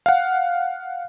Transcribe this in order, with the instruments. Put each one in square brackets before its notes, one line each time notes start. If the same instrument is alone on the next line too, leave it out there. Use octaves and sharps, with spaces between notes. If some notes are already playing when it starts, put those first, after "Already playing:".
[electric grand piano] F5 F#5